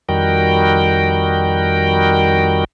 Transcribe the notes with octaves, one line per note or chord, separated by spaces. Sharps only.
F2 D#3 G3 F#4 A#4 G5